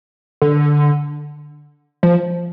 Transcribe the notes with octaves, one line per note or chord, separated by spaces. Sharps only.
D3
F3